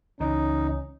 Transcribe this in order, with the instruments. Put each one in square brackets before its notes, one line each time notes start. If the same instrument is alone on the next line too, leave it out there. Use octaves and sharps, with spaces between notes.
[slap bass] C#2 E3 [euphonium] C#4 [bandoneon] D#4